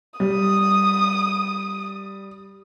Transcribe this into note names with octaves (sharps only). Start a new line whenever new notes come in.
G3 D#6